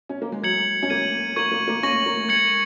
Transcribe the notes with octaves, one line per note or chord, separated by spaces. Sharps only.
C#4
A#3
G#3
F#3 G#6 C#7 F#7
C#4
A#3 G#6 D#7 F#7
A#3 C#6 G#6 D#7 F#7
A#3
A#3
C#4 C#6 A#6 F#7
A#3
G#3 G#6 C#7 F#7